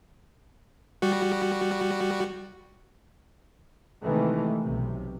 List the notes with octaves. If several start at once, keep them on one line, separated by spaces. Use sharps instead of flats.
G3 F#4
C3 D#3 E3 G#3 A3
B1 C3